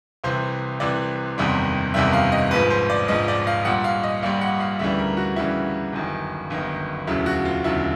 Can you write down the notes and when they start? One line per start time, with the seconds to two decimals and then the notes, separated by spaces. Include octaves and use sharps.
0.24 C2 C3 E3 C5
0.80 C2 C3 E3 D5
1.38 F#1 E2 C3 D#3 G3
1.94 F#1 E2 C3 D#3 G3 E5
2.13 F5
2.32 D#5
2.51 A#1 G#2 F3 B4
2.70 C5
2.90 D5
3.08 A#1 G#2 F3 D#5
3.28 D5
3.47 F5
3.65 A#1 A#2 G3 F#5
3.84 F5
4.03 D#5
4.22 A#1 A#2 G3 F5
4.41 F#5
4.60 F5
4.79 D2 C#3 E3 G3 E5
4.99 A#4
5.17 F#4
5.36 D2 C#3 E3 G3 E4
5.93 G1 F#2 D#3
6.50 G1 F#2 D#3
7.07 E1 D2 C#3 F#3 E4
7.26 F#4
7.45 F4
7.64 E1 D2 C#3 F#3 E4